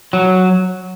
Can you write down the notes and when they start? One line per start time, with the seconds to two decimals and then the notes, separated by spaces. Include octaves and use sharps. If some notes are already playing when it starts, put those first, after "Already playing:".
0.13 F#3